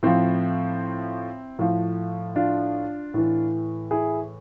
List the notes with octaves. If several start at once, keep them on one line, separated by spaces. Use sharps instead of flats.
A2 F3 C4 E4
A2 F3
D4 F4
A2 E3
E4 G#4